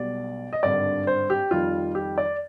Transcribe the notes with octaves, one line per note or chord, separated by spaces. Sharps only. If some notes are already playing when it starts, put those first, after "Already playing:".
Already playing: B1 B2 G3 D5
D#5
G#1 G2 D3 G3 D5
C5
G4
F2 D#3 G3 F4
G4
D5